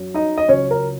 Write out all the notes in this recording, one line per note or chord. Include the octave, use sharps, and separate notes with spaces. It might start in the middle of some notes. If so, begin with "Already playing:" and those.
Already playing: F#2 F#3
D#4 D#5
D#5
C#2 C#3 F#3 C#4 C#5
A#4